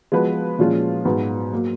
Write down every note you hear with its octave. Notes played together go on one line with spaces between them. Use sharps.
F3 G#3 B3 F#4 B4
A#2 F3 G#3 C#4 F4
G#2 F#3 B3 F#4 B4
F#3 A#3